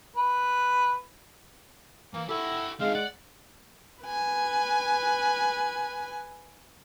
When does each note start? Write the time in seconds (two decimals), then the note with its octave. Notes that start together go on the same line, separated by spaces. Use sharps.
0.16 B4
2.14 E3 A#3
2.29 E4 G4 A4 F#5
2.80 G#3 C4 D#4 F5
2.95 D5 F#5
4.04 B4 G#5